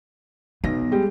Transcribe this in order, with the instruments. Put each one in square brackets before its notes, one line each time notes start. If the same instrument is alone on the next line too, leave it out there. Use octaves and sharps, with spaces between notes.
[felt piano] B1 A#6 [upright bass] B3
[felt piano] G3 G#3 G4